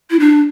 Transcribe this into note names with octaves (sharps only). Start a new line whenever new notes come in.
E4
D4